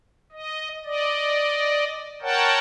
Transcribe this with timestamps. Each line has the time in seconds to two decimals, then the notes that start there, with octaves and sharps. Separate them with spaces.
0.32 D#5
0.85 D5 D#5
2.22 A#4 C#5 F#5 G5 A5